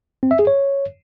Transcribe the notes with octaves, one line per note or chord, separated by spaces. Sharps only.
C4
E5
G#4
C#5